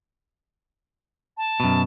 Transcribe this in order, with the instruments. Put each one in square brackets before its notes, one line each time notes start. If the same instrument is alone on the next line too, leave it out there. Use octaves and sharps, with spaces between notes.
[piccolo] A5
[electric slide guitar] F#2 B2